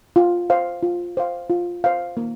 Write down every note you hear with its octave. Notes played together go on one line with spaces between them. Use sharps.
F4
C5 F5
F4
C5 F5
F4
C5 F5
A#3